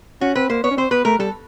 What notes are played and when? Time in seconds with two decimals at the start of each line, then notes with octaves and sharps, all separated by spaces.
0.21 C#4 F#4
0.35 C4 B4
0.50 A#3 C5
0.64 B3 C#5
0.71 C#4
0.77 C4 C5
0.91 B3 B4
1.05 A3 A#4
1.19 G3 A4